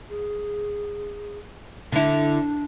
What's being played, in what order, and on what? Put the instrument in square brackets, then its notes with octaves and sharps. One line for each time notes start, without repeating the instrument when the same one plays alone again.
[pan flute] G#4
[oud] D3 E4 [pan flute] D4